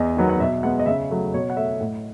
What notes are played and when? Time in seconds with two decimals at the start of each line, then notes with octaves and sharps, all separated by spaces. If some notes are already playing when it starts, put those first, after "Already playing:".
Already playing: E2 D#5
0.17 D#3 F#3 B3
0.29 F#5
0.40 B2 E5
0.63 G#3 B3 F#5
0.79 D#5
0.86 C#3 E5
1.11 F#3 A3
1.34 B2 C#5
1.50 F#5
1.57 A3 E5
1.80 A2